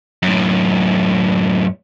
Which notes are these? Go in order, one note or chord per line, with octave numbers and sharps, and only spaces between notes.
F#2 A2